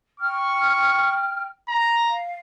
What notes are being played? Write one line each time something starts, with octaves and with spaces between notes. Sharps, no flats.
G5 C#6 F6
A#5
F5